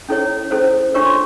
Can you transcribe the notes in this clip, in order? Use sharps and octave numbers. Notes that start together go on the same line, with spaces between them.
C#4 E4 A4 C#5
C#4 E4 A4 C5
D4 F4 A#4 C#5 C#6
C6